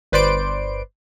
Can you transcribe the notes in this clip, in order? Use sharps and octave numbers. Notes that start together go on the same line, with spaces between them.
G1 B4 C5 D5 C6 D7